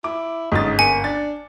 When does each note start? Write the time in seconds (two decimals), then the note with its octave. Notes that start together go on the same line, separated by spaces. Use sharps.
0.04 E4 D6
0.52 G1 G#2 C#4 D#5 A6
0.79 A#3 G#5 C#7
1.04 D4 A6